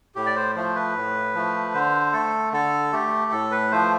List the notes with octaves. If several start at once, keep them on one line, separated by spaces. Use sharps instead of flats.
A2 G4
D5
C5
F3 A3 C5
B4
A2
F3 A3
D3 C5
A3 A4
D3 A4
A3 G4
A2 A4
B4
F3 A3 C5